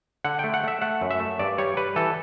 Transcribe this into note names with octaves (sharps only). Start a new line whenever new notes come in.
D3 F#5
A3 G5
F#5
A3 E5
A3 F#5
F#2
E5
A3
G2 D5
G3 C#5
G3 B4
E3 A4